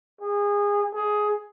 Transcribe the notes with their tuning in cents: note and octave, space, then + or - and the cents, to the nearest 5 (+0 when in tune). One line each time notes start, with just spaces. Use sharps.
G#4 -25
G#4 +10